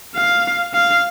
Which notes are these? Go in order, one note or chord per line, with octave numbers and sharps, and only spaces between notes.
F5
F5